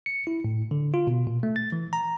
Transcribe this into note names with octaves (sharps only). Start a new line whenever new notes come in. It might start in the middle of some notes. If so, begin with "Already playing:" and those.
C#7
E4
A2
D3
F4
B2
A#2
A3
A6
E3
A#5